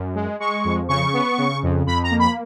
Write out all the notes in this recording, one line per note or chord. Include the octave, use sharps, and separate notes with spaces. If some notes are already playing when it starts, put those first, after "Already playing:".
Already playing: F#2
G#3
G#3 C#6
F2
C#3 C#6
B3
C#3
F2
F2 B5
A#5
A#3
B5